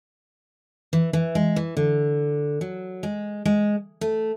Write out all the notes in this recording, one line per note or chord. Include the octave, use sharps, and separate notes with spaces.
E3
E3
G#3
E3
D3
F#3
G#3
G#3
A3